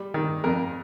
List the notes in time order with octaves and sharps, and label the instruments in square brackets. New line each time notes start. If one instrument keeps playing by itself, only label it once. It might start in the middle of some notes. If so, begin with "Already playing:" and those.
Already playing: [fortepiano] G3
D#3
F2 A#4